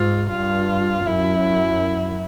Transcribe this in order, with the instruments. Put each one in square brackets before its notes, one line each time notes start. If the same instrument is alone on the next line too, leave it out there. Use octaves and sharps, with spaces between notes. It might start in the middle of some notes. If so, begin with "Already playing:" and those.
Already playing: [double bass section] G#2 [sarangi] F4
[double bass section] G2 [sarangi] F4
[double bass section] F#2 [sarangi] E4